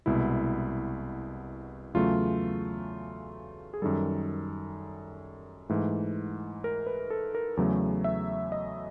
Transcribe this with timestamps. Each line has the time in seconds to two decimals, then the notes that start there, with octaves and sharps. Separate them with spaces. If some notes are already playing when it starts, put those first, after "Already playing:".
0.06 C2 B2 G#3 E4
1.94 E2 C#3 F#3 A3 F4
3.74 G#4
3.82 F#2 D#3 G3 A4
5.70 G#2 E3 A3
6.64 A#4
6.87 B4
7.10 A4
7.35 A#4
7.57 E2 C#3 F#3 A3
8.04 E5
8.52 D#5